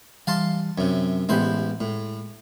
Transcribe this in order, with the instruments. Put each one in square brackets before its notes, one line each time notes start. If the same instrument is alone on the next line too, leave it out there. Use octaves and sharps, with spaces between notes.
[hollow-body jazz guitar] E3 G3 [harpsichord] F5 A5 C6
[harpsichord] F#2 C3 [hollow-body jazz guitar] C#5
[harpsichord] A1 E4 C5 [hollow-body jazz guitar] G#3 B3 G4
[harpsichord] A2 [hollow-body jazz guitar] G#3